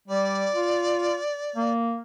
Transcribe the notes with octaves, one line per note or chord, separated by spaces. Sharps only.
G3 D5
F4
A#3